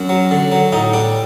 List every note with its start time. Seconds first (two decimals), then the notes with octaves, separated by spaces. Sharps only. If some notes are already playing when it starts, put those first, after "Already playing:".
Already playing: F#2
0.09 F#3
0.31 D3
0.52 F#3
0.72 A2 D#4
0.93 G3 D4